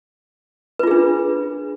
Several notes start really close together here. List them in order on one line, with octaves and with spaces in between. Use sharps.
B4 F4 G#4 D4